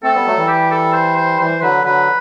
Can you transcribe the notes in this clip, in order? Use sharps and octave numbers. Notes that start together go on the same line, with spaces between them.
A3 C4 A4
G3 B3
F#3 A3
E3 G3
G4
A4
C5
C5
E3 C5
D3 F#3 B4
D3 F#3 B4